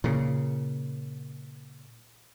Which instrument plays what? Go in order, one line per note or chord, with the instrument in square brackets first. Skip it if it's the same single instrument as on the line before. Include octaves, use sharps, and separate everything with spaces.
[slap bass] A#2 C#3